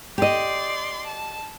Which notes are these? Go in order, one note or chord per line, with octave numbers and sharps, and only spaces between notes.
G4 D5 D#5 C6
A5